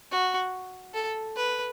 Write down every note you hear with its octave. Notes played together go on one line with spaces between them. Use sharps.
F#4
A4
B4